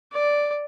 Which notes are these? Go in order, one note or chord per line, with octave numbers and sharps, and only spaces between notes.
D5